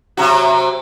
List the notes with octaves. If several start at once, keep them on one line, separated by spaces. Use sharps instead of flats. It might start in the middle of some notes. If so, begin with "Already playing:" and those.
C3 F#3 F#4